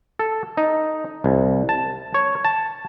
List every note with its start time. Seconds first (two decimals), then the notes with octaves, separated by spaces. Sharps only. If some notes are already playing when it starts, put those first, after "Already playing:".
0.19 A4
0.57 D#4
1.24 C2
1.69 A5
2.14 C#5
2.45 A5